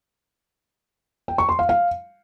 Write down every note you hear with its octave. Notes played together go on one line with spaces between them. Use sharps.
G5
C#6
C6
F5
F5